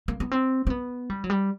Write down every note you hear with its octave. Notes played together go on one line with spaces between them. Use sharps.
A#3
B3
C4
C4
B3
G3
F#3
G3